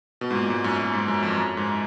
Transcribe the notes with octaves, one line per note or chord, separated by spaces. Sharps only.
B2
G#2
A#2
G#2
F#2
F#2
G#2
F#2
F2
F#2
G#2